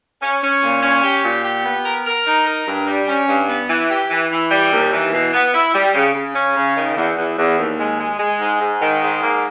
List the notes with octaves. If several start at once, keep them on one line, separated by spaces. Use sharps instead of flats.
C#4
C#4
A#2
C#4
G4
A#2
G4
B3
A#4
A#4
D#4
A#4
G2
G3
C#4
G2
B3
E3
G4
E3
E3
G3
D#2
E3
B2
B3
E4
G3
C#3
C#3
C#4
C#3
D#3
E2
E2
E2
D#2
G#3
G#3
G#3
G#2
G#2
D#3
G#2
A#3